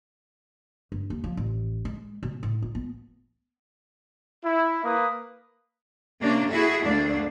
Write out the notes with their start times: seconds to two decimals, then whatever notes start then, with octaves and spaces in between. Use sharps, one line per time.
0.92 G2
1.10 D#2
1.24 F3
1.37 A1
1.85 G#3
2.23 B2
2.43 A2
2.62 F4
2.75 B3
4.44 E4
4.83 A#3 B4 D#6
6.22 C3 A#3 C#4 D4
6.52 E4 F#4 G#4 A4 E5
6.84 D2 A#3 D4